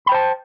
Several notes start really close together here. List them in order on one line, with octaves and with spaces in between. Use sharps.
B5 G5 C5 A5